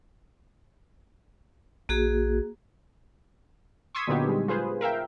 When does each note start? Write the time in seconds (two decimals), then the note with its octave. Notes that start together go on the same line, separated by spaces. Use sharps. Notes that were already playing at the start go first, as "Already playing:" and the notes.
1.89 A#1 A#3 F#4 G#4
3.95 C6 C#6 D#6 E6 G#6 B6
4.07 A#2 D3 F#3 B3 D#4 G4
4.28 G3 G#3
4.48 F4 G#4 B4 C5
4.81 A#4 E5 F5 G5